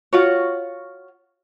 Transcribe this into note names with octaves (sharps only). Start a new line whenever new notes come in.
F4 F#4 C#5